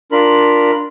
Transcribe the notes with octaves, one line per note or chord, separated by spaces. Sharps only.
D4 F4 A#4 B5